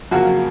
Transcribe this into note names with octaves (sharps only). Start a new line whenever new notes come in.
F2 C#3 F#3 A#3 F#4